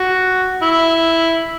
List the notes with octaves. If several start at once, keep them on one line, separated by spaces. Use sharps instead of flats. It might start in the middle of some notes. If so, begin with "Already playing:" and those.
Already playing: F#4
E4